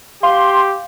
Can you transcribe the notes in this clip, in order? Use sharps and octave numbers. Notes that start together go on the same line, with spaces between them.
G4 F5 C6